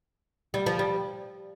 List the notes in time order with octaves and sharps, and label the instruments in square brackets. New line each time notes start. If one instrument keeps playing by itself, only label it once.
[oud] G3
F3
G3